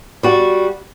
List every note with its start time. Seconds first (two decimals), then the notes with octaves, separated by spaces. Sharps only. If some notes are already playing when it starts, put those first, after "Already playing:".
0.23 G3 F#4